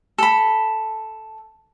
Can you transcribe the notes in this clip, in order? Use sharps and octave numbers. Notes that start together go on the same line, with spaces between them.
A4 B5